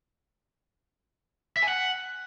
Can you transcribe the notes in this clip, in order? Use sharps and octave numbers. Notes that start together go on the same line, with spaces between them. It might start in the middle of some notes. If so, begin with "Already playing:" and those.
E5
G#5
F#5